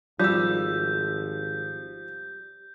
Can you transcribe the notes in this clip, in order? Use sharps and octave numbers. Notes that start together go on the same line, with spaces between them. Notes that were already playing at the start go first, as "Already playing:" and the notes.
G#1 F3 G3 E6 G6